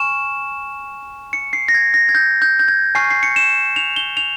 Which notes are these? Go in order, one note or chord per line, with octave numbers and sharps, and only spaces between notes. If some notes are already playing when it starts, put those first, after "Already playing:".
Already playing: G#5 C#6 F6 E7
C#7
C7
A#6
G#6
A#6
G#6
G6
G6
G6
G#6
G#5 C#6 F6 C7
C7
C#7
E7
F7
G7
F7